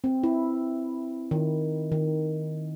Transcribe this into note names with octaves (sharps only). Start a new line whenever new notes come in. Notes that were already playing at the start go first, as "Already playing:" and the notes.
C4
E4
D#3
D#3